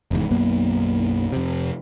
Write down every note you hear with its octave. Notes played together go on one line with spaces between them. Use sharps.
F1 E2 G#2
B1 F#2 A#3 B3
F2 C3